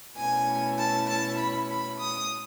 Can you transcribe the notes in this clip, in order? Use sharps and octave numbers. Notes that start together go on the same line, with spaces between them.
B2 A3 C#4 E4 G#5
A5
A5
B5
B5
D#6